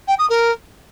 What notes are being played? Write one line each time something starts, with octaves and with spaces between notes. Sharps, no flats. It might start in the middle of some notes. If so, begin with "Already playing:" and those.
G5
D#6
A#4